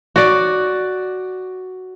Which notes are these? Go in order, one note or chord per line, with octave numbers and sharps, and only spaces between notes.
F#4 D5